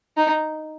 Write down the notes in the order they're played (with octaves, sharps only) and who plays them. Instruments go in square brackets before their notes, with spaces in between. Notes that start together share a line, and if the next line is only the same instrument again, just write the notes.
[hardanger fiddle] D#4